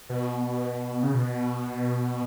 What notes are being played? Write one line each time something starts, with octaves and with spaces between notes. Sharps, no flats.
B2
C#3
B2